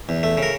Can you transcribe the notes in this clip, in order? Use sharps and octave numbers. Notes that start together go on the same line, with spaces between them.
E2
A3
C#3
A#4